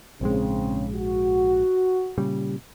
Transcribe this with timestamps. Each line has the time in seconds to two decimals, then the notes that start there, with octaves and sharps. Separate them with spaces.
0.21 A#1 G#2 C#3 G#3 C4
0.94 F#4
2.18 A#2 C#3 G3